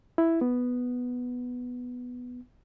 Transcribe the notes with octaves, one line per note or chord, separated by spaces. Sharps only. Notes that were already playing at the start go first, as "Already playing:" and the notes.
E4
B3